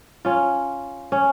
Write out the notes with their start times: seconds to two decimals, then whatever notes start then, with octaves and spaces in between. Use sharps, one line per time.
0.25 C#4 F4
1.12 C#4